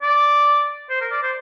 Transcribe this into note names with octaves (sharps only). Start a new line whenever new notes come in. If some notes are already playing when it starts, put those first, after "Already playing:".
D5
C5
A#4
D5
C5